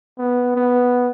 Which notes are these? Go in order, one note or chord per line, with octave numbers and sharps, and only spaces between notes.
B3
B3